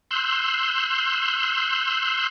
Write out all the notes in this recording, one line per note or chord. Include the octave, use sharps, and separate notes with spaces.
C6 E6 F#6 G6